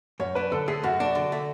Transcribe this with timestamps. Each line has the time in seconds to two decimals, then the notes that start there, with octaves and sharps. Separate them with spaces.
0.20 F#2 C#5
0.35 D4 B4
0.52 D3 A4
0.68 A3 G#4
0.83 F#2 F#4
1.00 D4
1.15 D3
1.32 A3